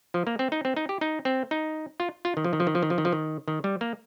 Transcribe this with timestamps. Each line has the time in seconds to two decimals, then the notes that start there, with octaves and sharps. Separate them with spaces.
0.14 F3
0.27 A#3
0.39 C4
0.52 D#4
0.65 C4
0.77 D#4
0.89 G4
1.01 D#4
1.25 C4
1.51 D#4
2.00 F4
2.25 F4
2.37 D#3
2.44 F3
2.53 D#3
2.60 F3
2.67 D#3
2.75 F3
2.83 D#3
2.90 F3
2.98 D#3
3.05 F3
3.13 D#3
3.48 D#3
3.64 G3
3.81 A#3